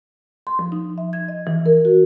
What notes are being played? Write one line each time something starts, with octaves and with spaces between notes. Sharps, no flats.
C6
F3
D#4
E5
G#6
D#5
E3
A#4
F#4